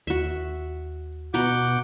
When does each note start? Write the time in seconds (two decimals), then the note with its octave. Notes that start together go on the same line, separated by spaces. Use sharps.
0.07 D#2 F#4 E5
1.34 B2 B3 F#4 F#5 A#5 D6 G6